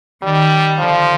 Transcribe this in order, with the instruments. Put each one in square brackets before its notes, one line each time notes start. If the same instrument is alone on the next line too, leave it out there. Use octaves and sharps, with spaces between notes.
[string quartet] D#3 [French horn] G3
[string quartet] D3 [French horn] F3